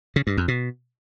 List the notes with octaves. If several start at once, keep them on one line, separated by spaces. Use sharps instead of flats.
C#3
G2
F2
B2